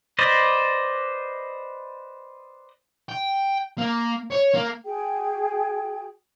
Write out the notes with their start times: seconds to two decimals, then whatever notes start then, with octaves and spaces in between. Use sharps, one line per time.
0.19 B4 C5 D5 D#5
3.09 G5
3.78 A#3
4.32 C#5
4.55 A#3
4.85 F#4 G#4 G5